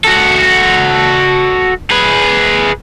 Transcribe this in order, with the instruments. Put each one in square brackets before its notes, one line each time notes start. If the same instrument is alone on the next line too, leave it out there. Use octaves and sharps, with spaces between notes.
[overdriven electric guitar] F#4 A4
G#4 B4